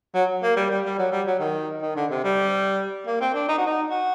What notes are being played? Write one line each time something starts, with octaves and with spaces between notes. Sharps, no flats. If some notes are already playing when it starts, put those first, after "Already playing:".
F#3
A#3
G3
G3
G3
F#3
G3
F#3
D#3
D#3
D3
C3
G3
A#3
C4
D4
D#4
F#4
D#4
F#4